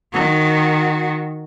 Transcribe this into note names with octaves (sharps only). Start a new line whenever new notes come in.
D#3 F#4